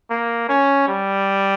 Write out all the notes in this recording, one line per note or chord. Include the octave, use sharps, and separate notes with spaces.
A#3
C#4
G3